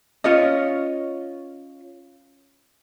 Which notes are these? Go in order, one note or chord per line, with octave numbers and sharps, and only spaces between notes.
C#4 F4 C#5 D#5